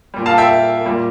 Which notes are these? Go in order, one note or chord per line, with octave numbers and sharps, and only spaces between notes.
A#2 G3
F5 A5
E5 G5
A#2 G3